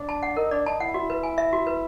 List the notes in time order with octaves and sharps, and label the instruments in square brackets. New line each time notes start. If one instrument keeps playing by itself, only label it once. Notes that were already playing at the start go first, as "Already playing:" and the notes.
Already playing: [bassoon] D4
[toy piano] A5
F#5
[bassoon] D#4 [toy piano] A#4
[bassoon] D4 [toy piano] D5
[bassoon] D#4 [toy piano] A5
[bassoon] E4 [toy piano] F#5
[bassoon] E4 [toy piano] F#4
[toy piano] B4
G#5
E5
F#4
B4